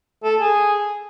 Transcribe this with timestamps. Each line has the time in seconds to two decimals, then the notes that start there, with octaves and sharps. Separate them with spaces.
0.24 A4
0.40 G#4